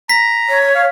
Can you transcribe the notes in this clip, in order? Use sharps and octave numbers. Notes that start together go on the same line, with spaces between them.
A#5 B6
C#5
F5